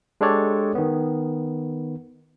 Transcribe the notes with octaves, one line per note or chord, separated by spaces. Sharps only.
G#3 D4 G4 A4 C#5 D5
D#3 B3